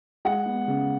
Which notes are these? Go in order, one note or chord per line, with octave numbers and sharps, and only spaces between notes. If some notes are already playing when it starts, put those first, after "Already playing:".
G#3 F#5
B3
C#3